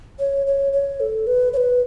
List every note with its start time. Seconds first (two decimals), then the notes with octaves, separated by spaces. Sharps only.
0.19 C#5
0.47 C#5
0.73 C#5
1.00 A4
1.27 B4
1.53 C#5
1.57 B4